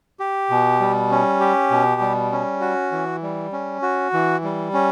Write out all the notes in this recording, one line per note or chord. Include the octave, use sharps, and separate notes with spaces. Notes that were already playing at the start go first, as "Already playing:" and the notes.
G4
B2
G3
C#4
G4
B2
G3
C#4
F#4
E3
G3
C#4
F#4
E3
G3
C#4